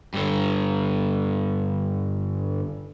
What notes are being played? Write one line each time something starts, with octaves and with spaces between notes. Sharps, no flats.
G2 D3